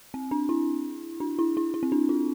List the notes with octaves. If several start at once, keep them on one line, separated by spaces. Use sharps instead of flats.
C4
D4
E4
D4
E4
E4
E4
C4
D4
F4